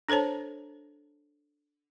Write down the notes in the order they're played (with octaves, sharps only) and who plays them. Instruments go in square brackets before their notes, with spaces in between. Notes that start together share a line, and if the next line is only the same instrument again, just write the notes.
[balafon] D4 A4 C5 C#5 A5